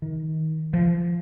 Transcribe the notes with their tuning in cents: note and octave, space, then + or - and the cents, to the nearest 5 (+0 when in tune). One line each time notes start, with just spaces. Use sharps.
D#3 +25
F3 -25